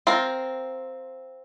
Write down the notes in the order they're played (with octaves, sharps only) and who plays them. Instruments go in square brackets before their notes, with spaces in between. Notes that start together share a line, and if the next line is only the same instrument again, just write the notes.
[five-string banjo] C4 F4 A#4